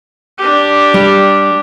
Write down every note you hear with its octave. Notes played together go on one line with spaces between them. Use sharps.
D4 G4
G3